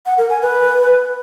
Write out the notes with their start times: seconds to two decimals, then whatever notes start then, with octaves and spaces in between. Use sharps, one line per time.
0.06 F#5
0.18 A#4
0.30 G#5
0.42 B4